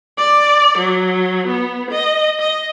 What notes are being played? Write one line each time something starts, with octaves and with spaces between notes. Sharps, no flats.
D5
F#3
B3
D#5
D#5